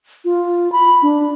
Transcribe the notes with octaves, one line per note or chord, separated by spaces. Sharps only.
F4
B5
D4